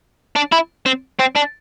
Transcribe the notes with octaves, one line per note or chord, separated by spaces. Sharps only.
D4
E4
C4
C4
D4